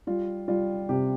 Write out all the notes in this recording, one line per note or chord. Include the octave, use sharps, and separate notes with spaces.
G3 F4
G3 F4
C3 G4